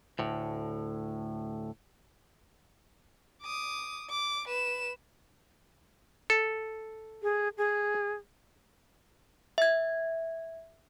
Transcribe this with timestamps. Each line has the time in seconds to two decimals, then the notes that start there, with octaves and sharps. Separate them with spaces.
0.19 D2 A2
3.42 D6 D#6
4.10 D6
4.48 B4 E7
6.30 A4
7.23 G#4
7.57 G#4
9.58 E5 G#6